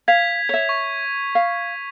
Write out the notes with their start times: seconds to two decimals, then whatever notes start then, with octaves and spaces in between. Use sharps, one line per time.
0.08 F5 G#6 B6 F7
0.49 C#5 E5
0.69 C#6
1.35 F5